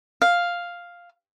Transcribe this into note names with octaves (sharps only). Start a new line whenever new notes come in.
F5